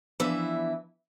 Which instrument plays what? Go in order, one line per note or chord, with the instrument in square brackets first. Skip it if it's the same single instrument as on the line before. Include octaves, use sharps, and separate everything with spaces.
[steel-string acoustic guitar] E3 E4 E5 [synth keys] F3 B3 D4